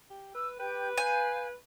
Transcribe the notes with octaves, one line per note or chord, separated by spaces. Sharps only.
G4
B4 E6
G4 B4 G5 G6
F5 G#5 G6